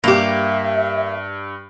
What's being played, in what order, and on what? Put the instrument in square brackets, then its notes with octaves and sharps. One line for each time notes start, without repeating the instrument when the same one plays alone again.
[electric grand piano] G2 [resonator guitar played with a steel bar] A#3 G4 [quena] E5